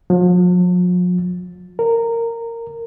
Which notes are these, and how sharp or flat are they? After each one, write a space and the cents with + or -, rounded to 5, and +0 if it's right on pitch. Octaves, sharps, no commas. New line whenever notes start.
F3 +45
A#4 -15